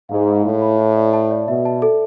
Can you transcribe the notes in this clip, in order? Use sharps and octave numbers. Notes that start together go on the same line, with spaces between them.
G#2 F5
B5
A2 F5
B5
E4
D5
A5
D5
B2 E5
A5
A4